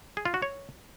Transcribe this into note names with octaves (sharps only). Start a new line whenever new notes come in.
G#4
F4
F#4
C#5